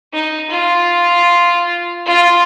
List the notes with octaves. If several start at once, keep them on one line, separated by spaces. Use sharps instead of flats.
D#4
F4
F4